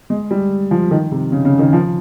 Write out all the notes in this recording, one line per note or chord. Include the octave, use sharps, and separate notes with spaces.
G#3
G3
F3
D#3
C3
C#3
C#3
D#3
F3